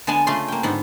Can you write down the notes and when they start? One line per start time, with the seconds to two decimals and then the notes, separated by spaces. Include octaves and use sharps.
0.07 D3 G#3 B3 G#5 A5
0.27 C#3 A3 F4 G#4 C6
0.48 A#3 G5
0.63 G#2 D3 B3